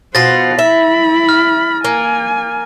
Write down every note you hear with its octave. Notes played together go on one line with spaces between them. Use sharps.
B2 F4 C5 F#5 A6 A#6
E4 E5 B5
F6
A#3 G#5